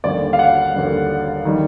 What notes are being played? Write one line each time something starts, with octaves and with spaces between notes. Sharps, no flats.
D#2 D3 G3 D5
F5
F#5
D#2 D3 G3
D#3 G3